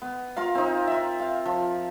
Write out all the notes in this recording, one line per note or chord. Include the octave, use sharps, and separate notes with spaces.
B3
F4 A#4 F5
C4 D#4
F4 E5
F5
F3